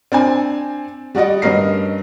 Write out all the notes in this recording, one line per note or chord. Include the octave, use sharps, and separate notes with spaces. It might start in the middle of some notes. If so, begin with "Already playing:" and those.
C4 D4 C5 G#5
G3 F#4 D5 D#5 F#5
G2 C#4 A#4 D#5 C7